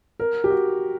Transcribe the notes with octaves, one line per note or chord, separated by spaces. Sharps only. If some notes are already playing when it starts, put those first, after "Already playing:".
A#4
G4
F#4